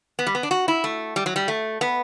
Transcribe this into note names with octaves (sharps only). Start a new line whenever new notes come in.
B3
G3
B3
D4
F#4
E4
A3
G3
F#3
G3
A3
B3